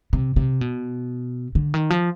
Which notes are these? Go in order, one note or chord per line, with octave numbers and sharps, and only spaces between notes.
C3
C3
B2
D3
D#3
F3